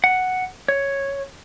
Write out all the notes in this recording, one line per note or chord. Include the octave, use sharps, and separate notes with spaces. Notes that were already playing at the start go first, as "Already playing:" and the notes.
F#5
C#5